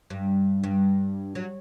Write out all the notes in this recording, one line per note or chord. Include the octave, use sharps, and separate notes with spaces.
G2
G2
F#3